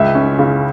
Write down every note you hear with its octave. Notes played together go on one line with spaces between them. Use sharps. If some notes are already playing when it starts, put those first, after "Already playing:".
Already playing: C#2 E5
C#4
C#3